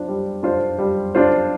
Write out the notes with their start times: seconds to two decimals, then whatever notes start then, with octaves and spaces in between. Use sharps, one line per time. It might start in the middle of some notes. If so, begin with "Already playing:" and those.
Already playing: D4 F4 C5
0.08 G3
0.43 D4 F4 C5
0.78 G3
1.15 D4 F4 C5